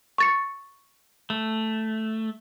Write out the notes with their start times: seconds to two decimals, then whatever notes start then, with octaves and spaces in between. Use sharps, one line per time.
0.18 C#6 A6 C#7
1.30 A3